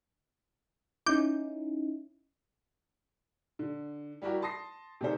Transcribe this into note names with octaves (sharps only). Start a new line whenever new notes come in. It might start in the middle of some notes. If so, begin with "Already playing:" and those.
C#4 D#4 E4 D6 G6
D3
G3 E4 F#4 G4 A#4
A5 C6 D#6 A#6 C7
C3 D#3 A4 A#4 C5